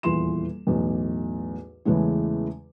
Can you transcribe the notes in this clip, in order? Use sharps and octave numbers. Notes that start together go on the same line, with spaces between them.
D#1 E2 E3 F4 C6 E7
B1 E2 A2
E2 C#3 E3 G#3 A3 C#4